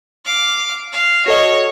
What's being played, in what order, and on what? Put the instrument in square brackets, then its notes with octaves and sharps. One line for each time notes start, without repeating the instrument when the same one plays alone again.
[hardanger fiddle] F5 D6
F5
[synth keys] F#4 A4 D#5 [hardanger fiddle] C#5